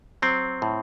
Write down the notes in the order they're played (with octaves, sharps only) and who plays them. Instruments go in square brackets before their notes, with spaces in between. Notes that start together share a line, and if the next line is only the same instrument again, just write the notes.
[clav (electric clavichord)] F#3 C4
A2